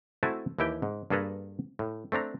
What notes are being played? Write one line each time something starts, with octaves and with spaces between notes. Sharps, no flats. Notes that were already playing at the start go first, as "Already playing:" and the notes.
A3 C4 E4 F#4 G#5 A5
D#2 E3 E4 G4 G5
G#2
G2 A#3 G#4 A4 B4 A#5
A2
A3 C4 D4 A#5